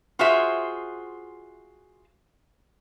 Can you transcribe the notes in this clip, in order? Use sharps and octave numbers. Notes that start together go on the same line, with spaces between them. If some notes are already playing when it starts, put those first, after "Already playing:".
F4 F#4 G#4 C5 E5